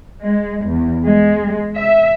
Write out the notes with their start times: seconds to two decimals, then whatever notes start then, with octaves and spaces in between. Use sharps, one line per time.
0.22 G#3
0.64 E2
1.03 G#3
1.74 E5